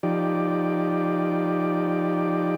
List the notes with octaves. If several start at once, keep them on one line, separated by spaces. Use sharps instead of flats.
F3 D#4 G4 D5